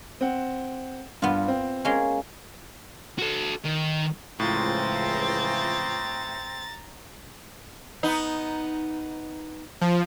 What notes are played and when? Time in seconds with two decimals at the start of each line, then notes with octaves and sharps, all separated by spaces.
0.21 C4 F#5
1.22 G2 B3 F4
1.48 C4
1.85 G#3 A#3 C#4
3.18 F#4 A4
3.65 D#3
4.40 C#2 A2 E3 F3 C4 F4 A#5 A6
8.03 B3 D#4
9.81 F3